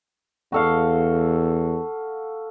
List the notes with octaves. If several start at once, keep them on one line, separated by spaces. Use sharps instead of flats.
E2 F#4 A4 F5